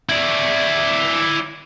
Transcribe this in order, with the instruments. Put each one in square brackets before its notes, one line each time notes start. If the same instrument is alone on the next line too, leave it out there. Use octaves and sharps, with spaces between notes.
[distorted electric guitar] E4 D5